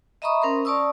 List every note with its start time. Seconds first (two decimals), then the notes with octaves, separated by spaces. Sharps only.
0.22 D#5 E5 A#5 B5 C#6 D#6
0.42 C#4 A#4 C5 C6
0.65 D5 A5 C#6 D#6 E6